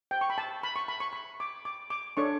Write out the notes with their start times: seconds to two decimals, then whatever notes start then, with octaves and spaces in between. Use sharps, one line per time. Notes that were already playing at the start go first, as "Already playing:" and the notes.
0.11 G5
0.21 C#6
0.30 B5
0.38 A5
0.63 B5
0.76 C#6
0.88 B5
1.00 C#6
1.13 B5
1.40 D6
1.65 D6
1.90 D6
2.17 D4 A4 C#5 C#6